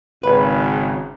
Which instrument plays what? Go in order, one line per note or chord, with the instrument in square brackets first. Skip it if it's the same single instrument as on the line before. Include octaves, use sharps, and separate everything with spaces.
[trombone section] G#1 C#3 [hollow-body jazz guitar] B4